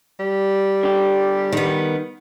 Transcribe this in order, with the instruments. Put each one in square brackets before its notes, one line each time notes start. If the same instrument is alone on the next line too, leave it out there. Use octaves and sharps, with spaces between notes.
[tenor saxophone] G3
[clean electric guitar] D3 G4
[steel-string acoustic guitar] D#3 B3